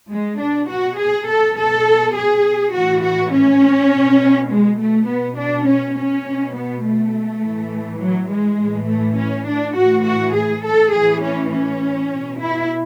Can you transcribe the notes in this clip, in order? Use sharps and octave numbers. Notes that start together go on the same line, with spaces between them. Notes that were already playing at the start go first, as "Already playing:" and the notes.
G#3
B2 D4
F#4
G#4
A4
B2 A4
G#4
A2 E3 F#4
F#4
C#4
B2
G#3
A3
B2 B3
D4
C#4
C#4
B2
B3
A3
A2 E3
F#3
G#3
A2 E3
A3
C#4
D4
A2 E3 F#4
F#4
G#4
A4
A2 E3 G#4
C#4
C#4
B2
E4